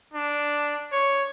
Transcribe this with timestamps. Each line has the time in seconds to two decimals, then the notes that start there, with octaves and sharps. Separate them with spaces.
0.14 D4
0.92 C#5